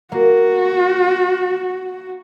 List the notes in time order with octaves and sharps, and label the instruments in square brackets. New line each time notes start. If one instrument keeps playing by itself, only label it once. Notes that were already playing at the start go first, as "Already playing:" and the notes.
[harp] A#3 [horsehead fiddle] F#4